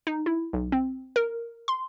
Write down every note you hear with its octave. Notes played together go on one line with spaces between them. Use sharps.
D#4
E4
B1
C4
A#4
C6